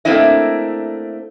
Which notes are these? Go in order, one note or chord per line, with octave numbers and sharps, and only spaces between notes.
A3 A#3 C4 D4 E4 D#5